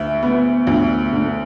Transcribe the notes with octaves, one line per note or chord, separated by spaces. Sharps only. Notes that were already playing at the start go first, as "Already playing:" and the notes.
Already playing: D2 E5
B3
D2
D3